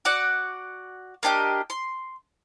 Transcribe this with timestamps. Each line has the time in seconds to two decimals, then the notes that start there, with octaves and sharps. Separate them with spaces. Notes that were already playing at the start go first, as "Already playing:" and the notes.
0.05 F#4 D5 F#5
1.23 A#3 D4 G4 D#5
1.70 C6